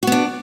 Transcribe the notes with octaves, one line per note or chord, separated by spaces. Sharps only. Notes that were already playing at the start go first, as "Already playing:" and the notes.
B3 D4 F#4